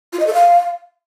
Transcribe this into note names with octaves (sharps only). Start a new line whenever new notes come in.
F4
D#5
A4
F5